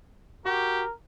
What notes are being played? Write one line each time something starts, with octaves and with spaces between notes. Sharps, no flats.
F#4 G4 A#4